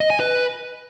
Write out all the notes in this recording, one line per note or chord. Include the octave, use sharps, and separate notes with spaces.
D#5
G#5
B4